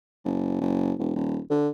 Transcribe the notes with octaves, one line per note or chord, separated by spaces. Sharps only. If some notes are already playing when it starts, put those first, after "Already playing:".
F#1
F#1
E1
D#1
D3